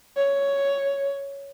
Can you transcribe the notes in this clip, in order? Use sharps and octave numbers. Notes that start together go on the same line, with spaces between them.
C#5